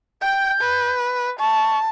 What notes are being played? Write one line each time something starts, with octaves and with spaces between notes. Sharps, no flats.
G5 G6
B4
A5 C#6